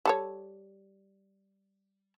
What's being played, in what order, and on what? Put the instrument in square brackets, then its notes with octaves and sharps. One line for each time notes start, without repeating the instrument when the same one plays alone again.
[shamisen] G3 A4 C#5